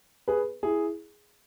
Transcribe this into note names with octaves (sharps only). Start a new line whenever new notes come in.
G#4 B4
E4 G#4